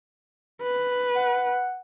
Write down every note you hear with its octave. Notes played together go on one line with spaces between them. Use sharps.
B4
F#5